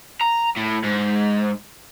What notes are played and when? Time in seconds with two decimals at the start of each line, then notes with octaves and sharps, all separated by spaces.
0.21 A#5
0.57 A2
0.84 G#2